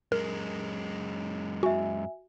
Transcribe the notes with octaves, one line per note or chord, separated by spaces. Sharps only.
F#2 G#3 A#4
F#4 E5 G#5